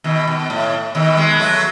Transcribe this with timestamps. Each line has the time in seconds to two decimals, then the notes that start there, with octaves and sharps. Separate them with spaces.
0.04 B2 D#3
0.27 B2
0.50 A2
0.95 B2 D#3
1.17 G#3 B3
1.40 F#3 A3